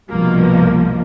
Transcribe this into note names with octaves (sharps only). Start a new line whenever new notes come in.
C2 G2 B2 F3 A#3